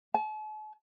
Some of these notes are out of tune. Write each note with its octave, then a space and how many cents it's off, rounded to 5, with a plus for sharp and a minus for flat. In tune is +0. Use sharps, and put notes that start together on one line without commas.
A5 -45